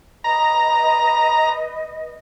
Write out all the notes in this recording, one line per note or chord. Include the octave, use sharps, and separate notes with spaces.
B4 D#5 A#5